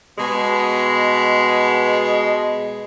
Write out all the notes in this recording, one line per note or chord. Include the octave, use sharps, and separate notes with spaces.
B2 G#3